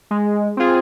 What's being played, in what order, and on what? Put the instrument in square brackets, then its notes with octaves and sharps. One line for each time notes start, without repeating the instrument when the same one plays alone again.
[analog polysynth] G#3
C4 F4 G#4